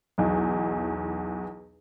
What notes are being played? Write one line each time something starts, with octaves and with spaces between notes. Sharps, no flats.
B1 E2